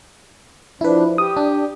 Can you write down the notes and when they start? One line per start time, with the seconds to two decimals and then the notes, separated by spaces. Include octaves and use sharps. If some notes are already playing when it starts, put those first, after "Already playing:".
0.81 F3 D4 E4 B4
1.18 G4 D#6
1.37 D4